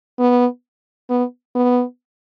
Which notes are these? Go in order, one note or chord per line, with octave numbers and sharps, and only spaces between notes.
B3
B3
B3